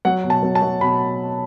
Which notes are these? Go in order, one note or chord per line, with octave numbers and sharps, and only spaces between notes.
F#3 F#5
B2
A5
F#3
A5
F#3
B2 B5